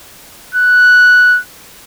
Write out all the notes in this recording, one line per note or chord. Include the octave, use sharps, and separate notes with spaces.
F#6